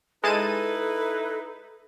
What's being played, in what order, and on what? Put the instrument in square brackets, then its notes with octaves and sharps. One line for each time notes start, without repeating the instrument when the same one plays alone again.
[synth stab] G#3 A5 D#7 [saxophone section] D#4 E4 B4 [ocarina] A4